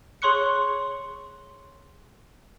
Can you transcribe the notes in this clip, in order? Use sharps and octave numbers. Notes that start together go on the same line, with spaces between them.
G#4 C#5 C6 C#6 F#6 C#7